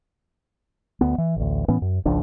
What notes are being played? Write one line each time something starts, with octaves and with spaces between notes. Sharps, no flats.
D2 B3
E3
A1 D2
A2 E3 B3 C#4
F#2
G#1 C#2 F3 D4